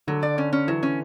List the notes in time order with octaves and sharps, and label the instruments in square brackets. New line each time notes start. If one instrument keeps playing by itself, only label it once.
[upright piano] D3 [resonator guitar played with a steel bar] F#3
[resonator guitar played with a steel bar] D5
C#4
C#4
[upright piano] E3 [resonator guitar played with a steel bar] F#3
[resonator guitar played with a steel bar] C#4